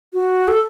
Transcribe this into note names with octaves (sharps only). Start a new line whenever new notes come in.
F#4
A4